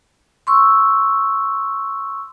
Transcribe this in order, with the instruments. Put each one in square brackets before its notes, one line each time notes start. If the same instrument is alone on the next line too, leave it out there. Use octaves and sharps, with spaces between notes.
[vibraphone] C6 C#6 E6